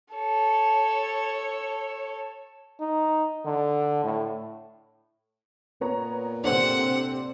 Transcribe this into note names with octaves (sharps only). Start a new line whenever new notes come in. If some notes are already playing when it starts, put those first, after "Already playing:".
A4 C#5
D#4
D3
A2
A#2 B3 C#5 A#5
C3 C4 D4 A4 C5 F#5